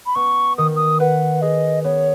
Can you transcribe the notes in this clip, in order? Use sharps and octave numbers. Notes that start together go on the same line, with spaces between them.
B5
B3 C#6
D#3 D#6
D#6
B4 F#5
G#4 D#5
B3 C#5